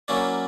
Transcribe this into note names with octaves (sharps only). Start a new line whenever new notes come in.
F#3 A#3 C#4 E4 D5